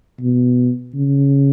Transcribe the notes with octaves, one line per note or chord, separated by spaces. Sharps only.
B2
C#3